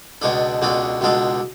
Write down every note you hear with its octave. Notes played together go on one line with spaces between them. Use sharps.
C#2 B2 G#3 D4 A4
C#2 B2 G#3 D4 A4
C#2 B2 G#3 D4 A4